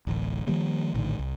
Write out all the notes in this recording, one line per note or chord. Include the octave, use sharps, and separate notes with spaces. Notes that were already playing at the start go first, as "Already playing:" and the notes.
D1 A1
D#3 F3 G3 A#3
A#1 A2 D3 D#3
C2